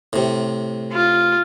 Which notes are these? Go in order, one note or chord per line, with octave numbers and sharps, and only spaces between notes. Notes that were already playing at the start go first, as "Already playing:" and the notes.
A2 C3
F4